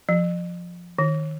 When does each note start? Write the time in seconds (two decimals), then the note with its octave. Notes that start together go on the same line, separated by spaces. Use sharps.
0.09 F3
0.99 D#3